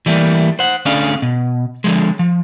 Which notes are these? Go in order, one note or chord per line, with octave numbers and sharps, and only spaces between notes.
E3 G3 A3 A#3
C5 F#5
D2 C#4 D4 G#4 A4 F5
B2
D3 F3 G#3
F3